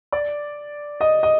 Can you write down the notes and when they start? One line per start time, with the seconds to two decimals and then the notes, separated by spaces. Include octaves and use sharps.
0.12 D5
1.01 D#5
1.23 D#5